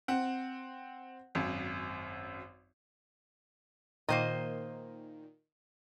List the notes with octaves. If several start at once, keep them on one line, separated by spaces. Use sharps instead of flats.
C4 F#5
G#1 F#2
A#2 D#3 A#3 C5 D#5